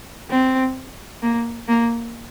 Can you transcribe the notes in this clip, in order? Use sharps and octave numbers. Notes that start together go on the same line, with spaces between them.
C4
A#3
A#3